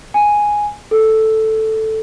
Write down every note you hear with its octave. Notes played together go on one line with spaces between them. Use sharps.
G#5
A4